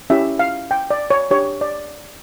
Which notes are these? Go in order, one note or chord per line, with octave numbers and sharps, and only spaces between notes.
C#4 E4 G4 E5
F5
G5
D5
C#5
D4 G4 C#5
D5